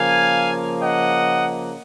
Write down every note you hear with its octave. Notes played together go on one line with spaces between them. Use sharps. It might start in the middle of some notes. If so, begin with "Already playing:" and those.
Already playing: C#3 F3 A#3 F5 G#5
D#5 F#5